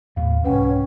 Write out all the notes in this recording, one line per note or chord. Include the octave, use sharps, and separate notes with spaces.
D#2 A2 A3 F5
C2 G#2 B2 C#4 B4 F#5 G5